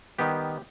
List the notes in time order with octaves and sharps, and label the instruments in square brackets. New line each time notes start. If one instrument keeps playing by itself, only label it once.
[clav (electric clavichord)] D#3 G3 B3 G4